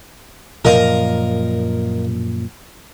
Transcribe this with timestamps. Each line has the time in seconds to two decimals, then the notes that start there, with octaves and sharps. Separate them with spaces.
0.65 F#2 A#2 F3 A#4 D#5 F5